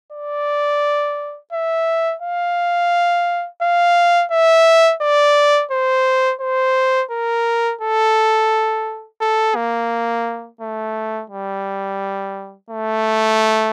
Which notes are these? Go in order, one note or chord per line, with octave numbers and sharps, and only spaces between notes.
D5
E5
F5
F5
E5
D5
C5
C5
A#4
A4
A4
A#3
A3
G3
A3